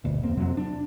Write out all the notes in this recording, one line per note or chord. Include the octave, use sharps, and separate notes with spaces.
D1 G1 D2 B2
E2 A#3 C4
F2 C3 F#3 C4
D4